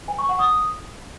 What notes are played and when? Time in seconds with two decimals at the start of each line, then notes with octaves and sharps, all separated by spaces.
0.08 G#5
0.19 C#6
0.29 F#5
0.39 D#6